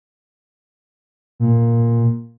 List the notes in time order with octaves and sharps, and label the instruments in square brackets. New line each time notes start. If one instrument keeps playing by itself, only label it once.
[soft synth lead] A#2